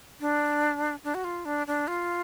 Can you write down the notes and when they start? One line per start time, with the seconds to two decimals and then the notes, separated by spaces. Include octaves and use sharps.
0.20 D4
1.04 D4
1.14 F#4
1.24 F4
1.45 D4
1.67 D4
1.87 F4